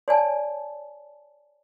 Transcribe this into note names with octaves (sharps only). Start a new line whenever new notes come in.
C#5 D5 G#5 A5